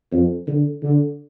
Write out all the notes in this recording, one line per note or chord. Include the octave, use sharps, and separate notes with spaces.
F2
D3
D3